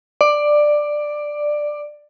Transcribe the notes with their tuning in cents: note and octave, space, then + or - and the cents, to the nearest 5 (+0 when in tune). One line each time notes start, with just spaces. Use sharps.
D5 +10